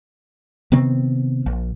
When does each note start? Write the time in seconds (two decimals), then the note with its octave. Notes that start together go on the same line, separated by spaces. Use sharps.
0.72 C3 D#3 B3 C4
1.46 A#1